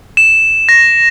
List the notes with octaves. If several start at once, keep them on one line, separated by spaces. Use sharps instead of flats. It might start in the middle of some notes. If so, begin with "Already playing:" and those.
E7
A#6